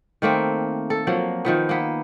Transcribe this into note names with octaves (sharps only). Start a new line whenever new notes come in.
D#3 A3 A#3 C4
A4
F3 F#3 A#3
D#3 F3 B3
A#3 B3